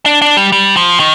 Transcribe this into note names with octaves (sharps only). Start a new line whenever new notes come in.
D4
D4
G3
G3
F3
D#3